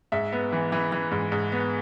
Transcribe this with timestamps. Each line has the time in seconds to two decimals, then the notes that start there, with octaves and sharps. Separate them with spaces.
0.12 G#2 E5
0.33 B3
0.52 E3
0.72 E3
0.92 E3
1.11 G#2
1.32 G#2
1.52 B3